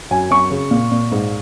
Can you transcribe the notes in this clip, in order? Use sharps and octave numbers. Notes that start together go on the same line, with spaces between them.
F#2 G#5
F#2 C#6
C#3
A#2
A#2
G#2